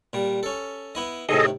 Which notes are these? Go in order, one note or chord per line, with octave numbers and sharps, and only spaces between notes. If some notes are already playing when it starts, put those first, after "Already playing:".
A#2 G3
C#4 A4
B3 E4 D#5
A2 C3 D#3 G#4 A4 D#5